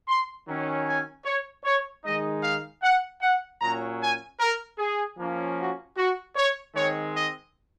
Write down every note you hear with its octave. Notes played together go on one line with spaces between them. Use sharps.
C6
D#3 F#3 C#4
G#5
C#5
C#5
D#3 G#3 D#4 D#5
F5
F#5
F#5
A#2 F#3 C#4 A#5
G#5
A#4
G#4
F3 A#3 C#4
F#4
F#4
C#5
D#3 G#3 C4 C#5
D#5